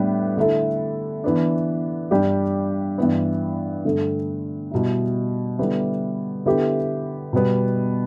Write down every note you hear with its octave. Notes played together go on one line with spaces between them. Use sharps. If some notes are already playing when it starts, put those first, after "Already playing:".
Already playing: A2 G3 B3 D4
D3 A3 E4 A4
E3 B3 D4
G2 G3 D4 G4
G2 E3 B3
G2 D3 A3
B2 G3 E4
D3 G3 B3 E4
D3 B3 E4 G4
B2 G3 B3